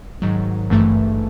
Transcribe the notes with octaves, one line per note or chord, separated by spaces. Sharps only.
G#2 D#3 F#3
G#1 G2 E3 A3